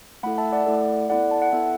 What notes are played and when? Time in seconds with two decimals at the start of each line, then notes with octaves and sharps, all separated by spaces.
0.23 A3 E4 A4 F#5 B5
0.38 E5 A5
0.52 D5 F#5
0.66 A3 E4 A4
1.10 B3 E4 A4 D5 F#5
1.31 A5
1.42 F#5
1.52 B3 E4 A4 E5